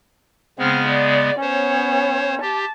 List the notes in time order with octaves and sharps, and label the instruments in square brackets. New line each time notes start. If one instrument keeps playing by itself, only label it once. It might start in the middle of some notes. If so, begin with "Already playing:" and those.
[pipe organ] C#3 G#3 B3 [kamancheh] C4 F6
[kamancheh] D5
[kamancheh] B3 C#4 [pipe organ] C5 C#5
[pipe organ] G4 [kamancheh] A5